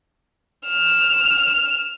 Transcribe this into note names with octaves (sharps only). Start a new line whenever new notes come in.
F6 E7